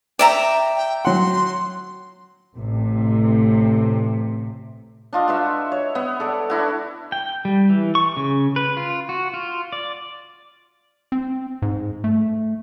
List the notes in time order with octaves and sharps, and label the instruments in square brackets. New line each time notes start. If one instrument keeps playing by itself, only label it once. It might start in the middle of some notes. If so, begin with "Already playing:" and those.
[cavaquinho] D5 E5 A#5 [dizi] G5
[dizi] G5
[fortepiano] F#3 F#5 [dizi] C6
[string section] A1 C3
[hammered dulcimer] D4 F4 D#5
F#4 B4 E5
C#5
B3
A4 D5
D4 E4 F#4
[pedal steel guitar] G5
G3
E3
C#6
C#3
B4
F4
F#4
F4
D5
[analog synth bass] C4
G#2
A3